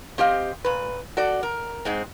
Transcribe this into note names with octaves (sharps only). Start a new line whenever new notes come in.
C4 G4 D#5 F5
A#2 B4
F#4 A4 D5
A#4
G#2 G#3 C4